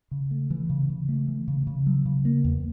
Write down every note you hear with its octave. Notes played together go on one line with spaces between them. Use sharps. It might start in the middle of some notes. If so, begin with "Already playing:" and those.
C#3
A3
E3
C#3
C#3
A3
E3
C#3
C#3
F#3
C#3
A#3
E2